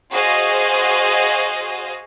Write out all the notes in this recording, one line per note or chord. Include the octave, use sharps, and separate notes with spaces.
F#4 G#4 C5 D#5 F5